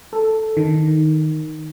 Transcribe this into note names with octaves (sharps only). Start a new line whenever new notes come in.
A4
D#3